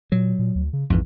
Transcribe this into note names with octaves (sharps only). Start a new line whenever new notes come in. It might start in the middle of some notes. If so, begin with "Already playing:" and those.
A#2 F#3
A#2
D2
C#3
A#1 F2 G#2 E3